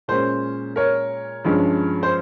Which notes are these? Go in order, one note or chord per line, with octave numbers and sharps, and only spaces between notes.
A#2 G#3 C#4 C5
A#4 C#5
G2 F3 G#3 C#4
C5